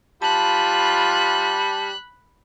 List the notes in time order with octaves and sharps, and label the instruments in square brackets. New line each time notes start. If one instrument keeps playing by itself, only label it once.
[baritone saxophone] G3 [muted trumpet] F4 [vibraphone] A5 [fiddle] B5 F#6